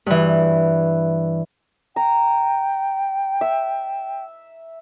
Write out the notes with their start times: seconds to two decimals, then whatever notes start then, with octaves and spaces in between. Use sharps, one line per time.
0.06 G2 E3
1.96 G5 A#5
3.41 E5